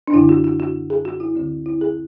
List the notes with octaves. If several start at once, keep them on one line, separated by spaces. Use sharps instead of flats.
D4
F#2 D3 E4
F#4
F#4
F#4
G#4
F#4
E4
D2 D3
E4
G#4